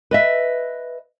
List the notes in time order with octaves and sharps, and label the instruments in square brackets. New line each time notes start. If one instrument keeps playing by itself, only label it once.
[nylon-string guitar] B4 D#5 E5